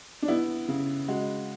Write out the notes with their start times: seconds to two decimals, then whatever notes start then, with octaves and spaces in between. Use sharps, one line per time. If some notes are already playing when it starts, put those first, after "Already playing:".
0.22 D4
0.28 B3 E4
0.68 C#3
1.08 G#3 F#4